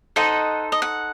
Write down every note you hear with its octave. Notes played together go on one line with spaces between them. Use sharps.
D#4 A4 C5 D#5 F#5
D#5
F#5